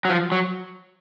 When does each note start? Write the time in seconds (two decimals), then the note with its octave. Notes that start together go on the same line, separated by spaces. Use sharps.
0.05 F#3
0.09 F3
0.32 F#3